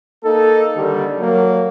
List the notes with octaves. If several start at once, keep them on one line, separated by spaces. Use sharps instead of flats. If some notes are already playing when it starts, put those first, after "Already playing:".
A#3 D#4 A4
D3 D#3 G3
F#3 A#3